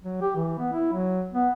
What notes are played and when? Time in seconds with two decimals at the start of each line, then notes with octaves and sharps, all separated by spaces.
0.04 F#3
0.22 G4
0.35 E3
0.59 B3
0.73 E4
0.92 F#3
1.33 B3